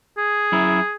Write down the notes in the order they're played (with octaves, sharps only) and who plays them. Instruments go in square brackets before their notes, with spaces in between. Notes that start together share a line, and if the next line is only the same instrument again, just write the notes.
[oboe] G#4
[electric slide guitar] F#2 E4 A#5